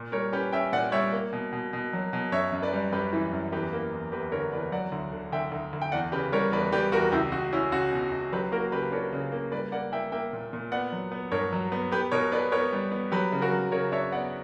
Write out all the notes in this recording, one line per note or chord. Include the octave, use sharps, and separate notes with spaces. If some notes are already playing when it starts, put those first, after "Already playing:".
Already playing: A#2
G3 A#4 C#5
C#4 G4 B4
C#4 E5 G5
A#2 D5 F#5
G3 C#5 E5
A#3
B2
B2
B2
F#3
B2
F#2 C#5 E5
F#2
B4 D5
G3
F#2 G4 B4
E3
F#2
E2 G4 B4
A#3
E2
E2 G4 B4
D3 A#4 C#5
E2 B4 D5
F#3 D5 F#5
D2
D3
D2 E5 G5
D2
D2
G5
E2 D5 F#5
C#3 G4 B4
G3 A#4 C#5
E2 B4 D5
G3 G4 B4
E2 F#4 A#4
C#2 E4 G4
C#2 F#4
C#4 E4
C#2 F#4
B2
C#2
F#3 G4 B4
A#3 F#4 A#4
C#3 G4 B4
D4 A#4 C#5
C#3
A#3
G3 B4 D5
A#3 D5 F#5
A#3 E5 G5
A#3 E5 G5
A#2
A#2
B3 D5 F#5
F#3
B3
G2 A#4 C#5
F#3
B3
B3 G4 B4
B2 A#4 C#5
B3 B4 D5
B3 A#4 C#5
G3
B3
F#3 G4 B4
C#3
F#4 A#4
F#3
C#3 A#4 C#5
D4 C#5 E5
B3 D5 F#5